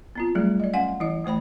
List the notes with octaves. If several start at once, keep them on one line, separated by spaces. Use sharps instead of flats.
B3 C4 F4
F#3 G3 A3 G#4 D5
D5 D#5
C#4 F5 F#5 G#5 C6
E3 E4 D#5
E3 A3 C5 G5 B5